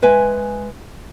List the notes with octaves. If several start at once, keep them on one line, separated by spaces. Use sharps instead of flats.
G#3 B4 E5 G#5